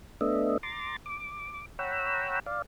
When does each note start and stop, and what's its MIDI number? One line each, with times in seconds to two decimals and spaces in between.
0.21 0.57 57
0.21 0.57 59
0.21 0.57 62
0.21 0.57 75
0.21 0.57 76
0.63 0.97 82
0.63 0.97 84
0.63 0.97 86
0.63 0.97 93
1.06 1.66 86
1.79 2.40 73
1.79 2.40 78
1.79 2.40 79
1.79 2.40 82
1.79 2.40 83
1.79 2.40 88
2.46 2.62 74
2.46 2.62 77